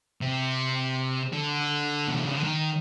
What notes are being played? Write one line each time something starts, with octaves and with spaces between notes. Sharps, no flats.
C3
D3
B2
C3
C#3
D3
D#3